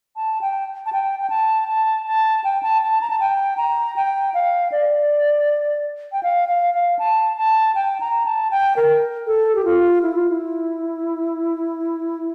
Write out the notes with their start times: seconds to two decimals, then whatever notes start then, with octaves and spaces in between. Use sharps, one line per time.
0.16 A5
0.41 G5
0.86 A5
0.92 G5
1.19 G5
1.30 A5
1.68 A5
2.06 A5
2.44 G5
2.63 A5
2.82 A5
3.01 A#5
3.10 A5
3.20 G5
3.57 A#5
3.96 G5
4.34 F5
4.72 D5
6.12 G5
6.23 F5
6.48 F5
6.74 F5
6.99 A5
7.38 A5
7.75 G5
8.00 A#5
8.25 A5
8.51 G5
8.76 A#4
9.27 A4
9.55 G4
9.65 F4
10.02 E4
10.15 F4
10.30 E4